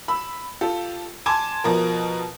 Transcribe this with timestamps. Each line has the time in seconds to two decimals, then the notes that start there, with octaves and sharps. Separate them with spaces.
0.08 B5 E6
0.61 F4 G4 A4
1.26 G#5 A5 C6 D6 G#6
1.64 B2 F3 A#4